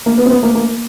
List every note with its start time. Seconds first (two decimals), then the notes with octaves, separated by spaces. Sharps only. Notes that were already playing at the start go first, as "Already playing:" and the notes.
0.06 A#3
0.18 B3
0.26 C4
0.31 B3
0.43 A#3
0.55 A#3